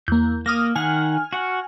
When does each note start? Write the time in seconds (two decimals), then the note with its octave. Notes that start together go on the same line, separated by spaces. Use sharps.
0.08 E2 A#3 G6
0.46 A#3 D#6 F6 A#6
0.75 D#3 F#5 G#5 F6
1.33 F#4 F#5